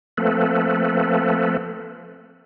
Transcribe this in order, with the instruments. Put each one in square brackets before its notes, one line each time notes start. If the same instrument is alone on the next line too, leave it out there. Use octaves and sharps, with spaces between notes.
[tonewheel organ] F3 A3 A#3 C4 A4 B4